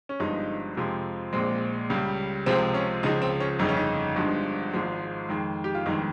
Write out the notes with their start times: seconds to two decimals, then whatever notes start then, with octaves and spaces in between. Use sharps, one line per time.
0.09 C#4
0.20 G1 G2 F3 G#3 D#4
0.77 F2 C3 F3 G#3
1.33 A#1 A#2 G#3 C4
1.90 C#2 C#3 G3
2.46 C#2 C3 F3 G#3 C4
2.74 C#4
3.03 C#2 C#3 F3 D#4
3.22 C4
3.40 C#4
3.59 G1 F2 C#3 D#4
3.69 C#4
3.77 D#4
4.16 G1 G2 F3 G#3
4.73 G#1 G#2 F3 G#3
5.29 F2 D#3 G#3
5.64 G4
5.75 F4
5.86 G1 F2 D#3 G#3 D#4